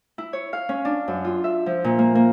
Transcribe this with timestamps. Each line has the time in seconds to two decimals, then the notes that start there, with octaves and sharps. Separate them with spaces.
0.18 E4
0.33 C#5
0.53 F5
0.69 C#4
0.85 D4
1.08 F#2
1.24 F4
1.44 E5
1.66 F3
1.84 A#2
1.99 A#3
2.15 A#3